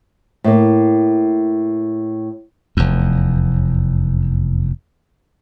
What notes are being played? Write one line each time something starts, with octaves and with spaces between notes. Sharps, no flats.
A2 A#3
F1 E2